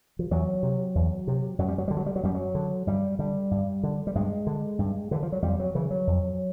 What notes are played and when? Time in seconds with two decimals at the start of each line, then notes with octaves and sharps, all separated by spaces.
0.19 F3
0.31 E2 F#3
0.63 C3
0.95 E2
1.27 C3
1.59 F#2 F#3
1.68 G3
1.78 F#3
1.88 D3 G3
1.97 F#3
2.06 G3
2.16 F#3
2.23 F#2 G3
2.35 F#3
2.55 D3
2.87 G2 G3
3.19 D3 G3
3.51 G2
3.83 D3
4.07 G3
4.15 G2 G#3
4.47 D3
4.79 G2
5.11 D3 E3
5.23 F3
5.32 F#3
5.43 F2 G3
5.60 F#3
5.75 C#3 E3
5.91 F#3
6.07 F2